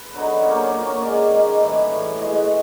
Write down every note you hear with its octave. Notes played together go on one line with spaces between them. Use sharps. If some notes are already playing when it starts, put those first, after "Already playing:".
Already playing: B4
D3 F#3 B3 D#4
A#2 F#3 A#3 C#4 C#5
C5
C#5
A#2 F#3 A#3 C#4
D#3 G#3 C#4 D5
D#3 G#3 C#4
A2 E3 G3
A2 E3 G3
B2 G#3 B3 D#5